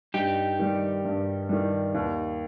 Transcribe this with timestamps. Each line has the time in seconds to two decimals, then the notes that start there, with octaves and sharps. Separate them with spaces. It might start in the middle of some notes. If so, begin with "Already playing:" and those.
0.14 G2 D#4 G4
0.59 D#3 G3
1.05 G2
1.49 D#3 G3
1.94 D#2